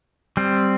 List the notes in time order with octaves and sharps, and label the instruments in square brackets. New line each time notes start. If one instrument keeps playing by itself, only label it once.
[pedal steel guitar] G3 C4